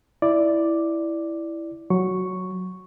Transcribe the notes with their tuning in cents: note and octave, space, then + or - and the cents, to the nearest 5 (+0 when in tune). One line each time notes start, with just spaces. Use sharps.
E4 +0 D5 +0
F#3 +0 C#6 +0